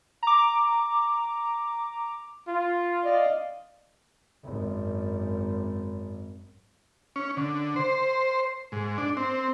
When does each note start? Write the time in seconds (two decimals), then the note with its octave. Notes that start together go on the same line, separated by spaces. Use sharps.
0.23 A#5 D6
2.48 F4
3.05 D5 D#5 F5
4.44 G#1 F#2
7.16 C#4
7.37 D3
7.76 C5
8.72 G#2
8.98 D4
9.17 C4